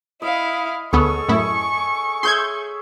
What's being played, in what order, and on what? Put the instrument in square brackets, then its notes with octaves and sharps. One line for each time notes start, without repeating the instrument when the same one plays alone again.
[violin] E4 F5 [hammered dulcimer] D#5
[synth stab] D2 B3 [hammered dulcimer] G#4 A4 C#5 [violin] C#6
[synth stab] F#2 A2 E4
[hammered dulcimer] G#4 C#5 E5 [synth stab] C6 G6 G#6